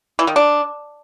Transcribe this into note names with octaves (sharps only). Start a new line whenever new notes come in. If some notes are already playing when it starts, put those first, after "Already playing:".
E3
D#3
D4